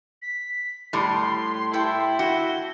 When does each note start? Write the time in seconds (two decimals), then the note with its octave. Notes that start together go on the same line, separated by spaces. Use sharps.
0.22 B6
0.93 A2 G3 C6
1.73 E4 A4 G5 C#6
2.19 F#4 G7